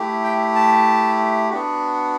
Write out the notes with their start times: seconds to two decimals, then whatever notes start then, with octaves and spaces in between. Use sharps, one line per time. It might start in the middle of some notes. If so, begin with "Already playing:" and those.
Already playing: A3 E4 G4
0.24 G5
0.55 A5
1.50 B3 D4 F#4